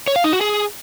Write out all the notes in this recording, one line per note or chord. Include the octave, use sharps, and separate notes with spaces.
C#5
F5
D#4
F#4
G#4